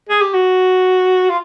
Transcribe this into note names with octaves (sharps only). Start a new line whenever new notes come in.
G#4
G4
F#4
F4